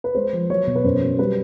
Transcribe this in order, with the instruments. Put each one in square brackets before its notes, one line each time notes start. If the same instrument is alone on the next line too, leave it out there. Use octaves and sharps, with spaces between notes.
[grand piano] B4
G#3 C5
F3
F#3 C#5
B2
B4
F#2 C5
F#3
G3 B4